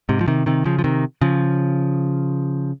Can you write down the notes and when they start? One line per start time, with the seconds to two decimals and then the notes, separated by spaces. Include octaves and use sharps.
0.09 G#2 C3
0.21 F3
0.28 C3 D#3
0.46 C3 D#3
0.65 C#3 F3
0.79 F3
0.84 C3 D#3
1.21 C#3 F3